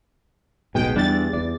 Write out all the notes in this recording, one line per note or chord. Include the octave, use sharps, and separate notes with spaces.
D1 B1 B2 G#3 G5
E2 G3 D4 A6
E2 D5